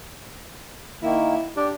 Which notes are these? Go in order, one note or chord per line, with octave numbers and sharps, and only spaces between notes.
D#3 A#3 E4
D4 G4